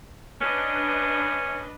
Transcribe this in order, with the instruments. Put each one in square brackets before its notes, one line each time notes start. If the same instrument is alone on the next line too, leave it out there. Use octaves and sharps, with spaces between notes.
[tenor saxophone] C#4 [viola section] D4 B4 D#5